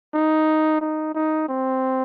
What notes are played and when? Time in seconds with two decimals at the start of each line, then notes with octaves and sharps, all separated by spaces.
0.14 D#4
0.81 D#4
1.15 D#4
1.49 C4